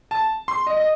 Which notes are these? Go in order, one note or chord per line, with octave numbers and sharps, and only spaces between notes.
A5
C6
D#5
D#5